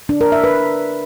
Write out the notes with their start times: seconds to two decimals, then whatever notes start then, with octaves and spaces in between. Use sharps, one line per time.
0.09 D4
0.21 A#4
0.32 E5
0.44 B4